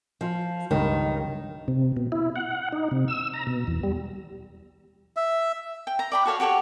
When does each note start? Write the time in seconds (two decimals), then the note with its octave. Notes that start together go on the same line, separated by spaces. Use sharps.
0.21 F3
0.71 C#2 G2 D#3
1.68 C3
1.97 B2
2.12 E4
2.36 F#5
2.73 D#4
2.91 C3
3.08 E6
3.34 A#5
3.47 B2
3.67 E2
3.83 G3
5.16 E5
5.87 G5
5.99 A#5
6.12 D5 G5 B5
6.25 F#4 A4 C#5 F5
6.40 F#4 G4 A4 C#5